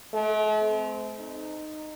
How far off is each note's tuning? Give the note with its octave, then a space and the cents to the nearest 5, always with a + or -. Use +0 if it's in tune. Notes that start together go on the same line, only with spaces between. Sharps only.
A3 -45
C4 -20
D#4 -15